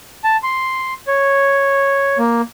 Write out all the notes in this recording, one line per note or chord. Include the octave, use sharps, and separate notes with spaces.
A5
C6
C#5
A#3